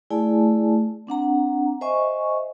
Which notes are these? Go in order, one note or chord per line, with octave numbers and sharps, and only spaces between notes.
A3 E4 G#4 D5 G#5 A5
C4 D4 F#5 A#5
C5 D#5 E5 G#5 C#6